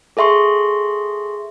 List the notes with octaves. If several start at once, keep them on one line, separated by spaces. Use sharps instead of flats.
G#4 A4 E5 C6 C#6